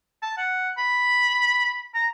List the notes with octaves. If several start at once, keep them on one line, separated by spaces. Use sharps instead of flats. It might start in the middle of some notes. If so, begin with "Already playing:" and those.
A5
F#5
B5
A#5